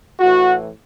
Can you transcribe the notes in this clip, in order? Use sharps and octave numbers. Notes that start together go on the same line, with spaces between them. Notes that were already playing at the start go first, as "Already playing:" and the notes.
A2 E3 F#4